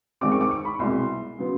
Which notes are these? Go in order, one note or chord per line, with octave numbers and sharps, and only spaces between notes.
G#2 D#3 G#3 C4 D6
C#6
D6
C#6
B5
C2 B2 G#3 C6
C#3 F#3 B3